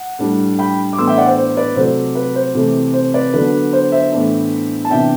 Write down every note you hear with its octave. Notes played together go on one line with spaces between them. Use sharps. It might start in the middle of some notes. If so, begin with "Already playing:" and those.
Already playing: F#5
A2 G3 D4
G5 B5
D6
A2 E3 B3 D4 C6 E6
E5 G5
D5 F#5
C5
C5
B4 D5
C3 F#3 A3 C5
B4
C5
C3 E3 A3 C4
C5
B4 D5
D3 F#3 B3 D4 B4
C5
C5 E5
A2 E3 B3 D4
A5
C3 E3 B3 D4 E5 G5